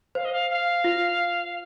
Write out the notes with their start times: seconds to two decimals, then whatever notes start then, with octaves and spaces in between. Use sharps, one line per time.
0.15 C5 F5
0.25 D#5
0.32 F5
0.51 F5
0.84 F4